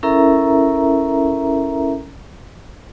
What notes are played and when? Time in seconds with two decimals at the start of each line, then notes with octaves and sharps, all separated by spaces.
0.03 C#4 E4 A4 A#4 E5 A#5